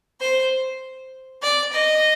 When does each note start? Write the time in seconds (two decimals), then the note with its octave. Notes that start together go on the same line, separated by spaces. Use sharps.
0.21 C5
1.42 D5
1.72 D#5